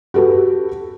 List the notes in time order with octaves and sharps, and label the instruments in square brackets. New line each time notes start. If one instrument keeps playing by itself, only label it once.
[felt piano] F#4 G4 A4 B4